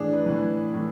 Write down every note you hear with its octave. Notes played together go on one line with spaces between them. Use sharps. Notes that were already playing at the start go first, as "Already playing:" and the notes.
Already playing: A2 E3 D4 G#4
B4
A2 E3 B4
A2 E3